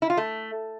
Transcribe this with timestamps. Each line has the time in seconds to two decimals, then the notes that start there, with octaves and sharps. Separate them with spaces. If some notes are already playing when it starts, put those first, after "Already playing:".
0.02 E4
0.10 F4
0.17 A3